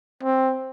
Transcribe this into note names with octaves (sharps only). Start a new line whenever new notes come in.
C4